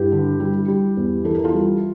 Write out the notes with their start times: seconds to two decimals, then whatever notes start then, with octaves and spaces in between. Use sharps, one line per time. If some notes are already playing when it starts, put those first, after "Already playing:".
Already playing: G2 E4 G4
0.12 D3
0.40 G3
0.68 G3
0.97 E2
1.24 E3 A4
1.35 A#4
1.44 F4 A4
1.53 G3